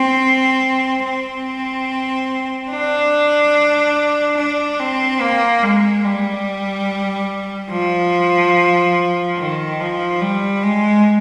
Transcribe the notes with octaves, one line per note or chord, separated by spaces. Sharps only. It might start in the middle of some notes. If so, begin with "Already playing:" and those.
Already playing: C4
C4
D4
D4
C4
A#3
G#3
G3
F3
D#3
F3
G3
G#3